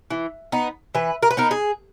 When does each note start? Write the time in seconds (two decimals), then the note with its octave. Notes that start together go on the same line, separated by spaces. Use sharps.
0.11 E3
0.52 B3 D#4
0.95 E3 B4
1.23 A#4
1.31 B4
1.37 B3 D#4 A#4
1.51 G#4